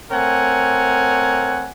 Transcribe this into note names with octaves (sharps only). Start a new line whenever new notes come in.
A3 C4 A#4 C#5 F#5 G#5